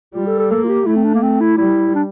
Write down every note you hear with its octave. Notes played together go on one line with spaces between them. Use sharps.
G3 F4
A4
A4
A#3 A4
F4
G4
A3 E4
C4
D4
A#3
C4
E4
G3 E4
D4